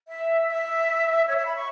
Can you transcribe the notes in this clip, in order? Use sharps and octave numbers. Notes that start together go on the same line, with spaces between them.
E5
E5
C#5
E5
B5
C#6